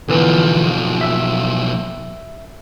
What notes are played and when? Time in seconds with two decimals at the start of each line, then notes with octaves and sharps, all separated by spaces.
0.08 B1 D3 E3 F3 B3
1.01 E5 E6